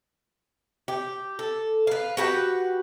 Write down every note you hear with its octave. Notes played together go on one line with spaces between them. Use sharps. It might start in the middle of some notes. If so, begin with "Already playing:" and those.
G4
A4
B4 F5
F#4 G4 B4 F#5